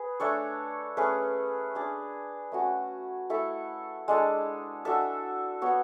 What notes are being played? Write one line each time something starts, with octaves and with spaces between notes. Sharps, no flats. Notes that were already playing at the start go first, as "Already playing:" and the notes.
Already playing: G#4 B4
A3 D4 A4 C#5
A3 C#4 G#4 B4
D4 G#4 D5
A3 C#4 F#4
A3 E4 A4 E5
G#3 D4 A4
D4 F#4 A4 E5
B3 F#4 C#5